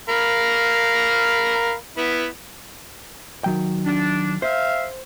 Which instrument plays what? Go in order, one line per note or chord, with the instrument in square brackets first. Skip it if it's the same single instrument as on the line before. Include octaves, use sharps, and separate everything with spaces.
[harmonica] A#4 F5 B5
B3 E4
[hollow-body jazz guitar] D#3 F#3 G5
[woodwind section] D4
[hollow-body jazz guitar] C5 [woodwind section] E5 F5